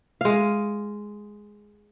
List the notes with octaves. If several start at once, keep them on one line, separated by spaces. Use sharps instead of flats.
G#3 F5